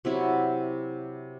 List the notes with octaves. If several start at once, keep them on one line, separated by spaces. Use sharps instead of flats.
C3 F#3 E4